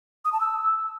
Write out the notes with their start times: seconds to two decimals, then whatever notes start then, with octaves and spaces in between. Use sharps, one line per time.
0.25 D#6
0.33 A5
0.40 E6